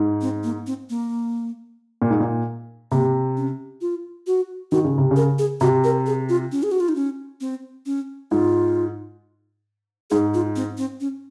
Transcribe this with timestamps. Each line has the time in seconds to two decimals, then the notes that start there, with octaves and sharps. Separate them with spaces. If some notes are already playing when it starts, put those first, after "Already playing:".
Already playing: G#2
0.21 C4
0.44 A#3
0.67 C4
0.90 A#3
2.02 A#2
2.10 G#2
2.20 A#2
2.92 C3 A#3
3.37 C#4
3.81 F4
4.27 F#4
4.72 D#3 F#4
4.84 C#3
4.98 C3
5.11 C#3
5.16 A#4
5.39 G#4
5.61 C3 F#4
5.84 A#4
6.06 G#4
6.29 F4
6.52 C#4
6.63 G#4
6.71 F#4
6.80 F4
6.88 D#4
6.96 C#4
7.41 C4
7.86 C#4
8.31 G#2 F4
10.10 G#2 G#4
10.34 F4
10.56 C4
10.78 C4
11.00 C#4